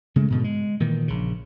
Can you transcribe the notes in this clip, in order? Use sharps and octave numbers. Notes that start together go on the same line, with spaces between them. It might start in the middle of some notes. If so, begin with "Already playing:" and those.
C#3 G#3 A3
G#2 B2 D3
G#3
A#2 D#3 E3
A#1 C#3